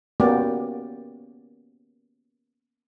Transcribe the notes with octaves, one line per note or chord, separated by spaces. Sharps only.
A#3 B3 C#4 F#4 G4 D5